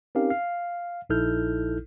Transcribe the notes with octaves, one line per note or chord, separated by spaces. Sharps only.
C4 C#4 D#4 G4 A#4 F5
F5
A#1 D#4 E4 A4 F6 G6